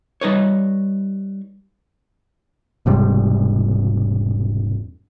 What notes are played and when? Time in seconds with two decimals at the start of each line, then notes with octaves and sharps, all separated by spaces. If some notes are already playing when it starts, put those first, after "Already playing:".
0.21 G3 D#4 B4 C#5
2.86 E1 G#2 C3 G3